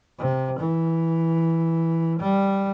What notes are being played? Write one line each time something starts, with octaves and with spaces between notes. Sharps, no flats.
C3
E3
G3